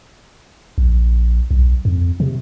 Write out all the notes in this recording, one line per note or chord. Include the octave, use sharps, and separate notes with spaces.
A#1
B1
F2
C3